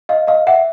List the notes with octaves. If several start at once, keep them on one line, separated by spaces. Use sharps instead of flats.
D#5 F5
D#5 F5
E5 F#5